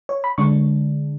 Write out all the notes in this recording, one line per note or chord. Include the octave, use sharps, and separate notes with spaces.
C#5
B5
D3 G#3 D4 C#6